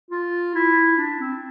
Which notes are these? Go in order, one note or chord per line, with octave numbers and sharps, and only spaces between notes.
F4
E4
D4
C4